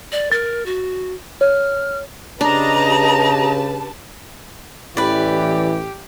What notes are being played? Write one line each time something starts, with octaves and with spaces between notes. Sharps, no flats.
D5
A#4 A6
F#4
C#5 F6
C#3 D4 G4 B4 D#5 A5 A#5
A1 E3 G4 B4 D5